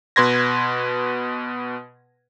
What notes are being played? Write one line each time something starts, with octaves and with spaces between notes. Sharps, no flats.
B2 B4 C6 G#6 A#6